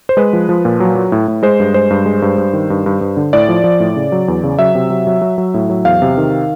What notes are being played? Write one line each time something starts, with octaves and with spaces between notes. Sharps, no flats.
C5
G#3 B4
F3
F3
A#2
F#3
F#3
A2
A2
G#3 C5
G2
G#3 C5
G2
G#3
G2
G2
D#3
G2
G2
G2
D3
A2 D5
F3
F3
A2
C#3
F#3
E2
C#3
F#3 E5
C3
F#3
F#3
F#3
F#3
A2
F#3
E2 F5
C3
D#3